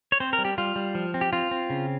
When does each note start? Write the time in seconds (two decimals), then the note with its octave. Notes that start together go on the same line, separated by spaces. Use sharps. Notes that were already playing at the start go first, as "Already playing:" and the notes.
0.12 C#5
0.20 C4 C5
0.33 A#4
0.39 G3
0.45 G4
0.58 G3 F4
0.76 G3
0.95 F3
1.14 C4
1.21 G4
1.33 C4 F4
1.51 C4
1.70 C#3